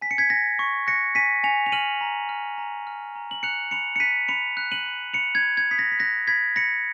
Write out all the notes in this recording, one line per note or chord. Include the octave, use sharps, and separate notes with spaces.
G#5 B6
C#7
G#6 B6
G#5 A#6
C#6
F#6 A#6 C#7
G#5 B6 D#7
G#5 C#7 F7
F7
F6 D#7 F#7
A#5
F6
A#5
F6
A#5
F#7
F#6 C#7 F7
B5 C#7 F7
C#7
F#6 B6 D#7
B5 C#7 F7
F#6
D#7 F#7
B5
B5 C#7 F7
G#6
B5
G#6
D#6 B6
A#6
B6
F#6 A#6
B5 G#6 B6
B5 A#6 C#7